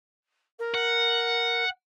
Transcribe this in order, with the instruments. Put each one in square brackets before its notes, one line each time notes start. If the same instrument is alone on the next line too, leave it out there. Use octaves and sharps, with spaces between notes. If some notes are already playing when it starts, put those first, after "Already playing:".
[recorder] A#4
[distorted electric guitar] F#5